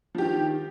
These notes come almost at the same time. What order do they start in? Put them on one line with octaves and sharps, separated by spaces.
F3 G4 D#3